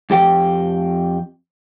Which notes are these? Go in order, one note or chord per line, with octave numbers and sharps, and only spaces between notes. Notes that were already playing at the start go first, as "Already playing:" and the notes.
F2 G4 G5